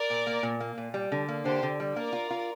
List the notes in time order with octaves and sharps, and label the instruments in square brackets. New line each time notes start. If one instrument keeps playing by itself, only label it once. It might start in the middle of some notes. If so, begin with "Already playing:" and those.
Already playing: [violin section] A#4 D5
[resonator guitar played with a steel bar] A#2
A#3
A#2
A#3
A#2
G3
D3
A#3
[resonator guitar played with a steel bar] D3 [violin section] G4 C5
[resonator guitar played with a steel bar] D3
G3
[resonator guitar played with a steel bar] A#3 [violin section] A#4 D5
[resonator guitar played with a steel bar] F4
F4